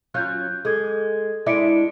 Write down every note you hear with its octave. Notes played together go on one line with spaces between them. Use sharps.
F#3 C#4 F4 F#6 G6
G#3 G#4 A4 G#6
G#3 D4 E4 E5 C#7 D7